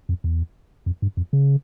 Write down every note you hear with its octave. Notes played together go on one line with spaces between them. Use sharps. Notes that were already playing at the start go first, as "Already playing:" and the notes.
F2
E2
F2
G2
F2
C#3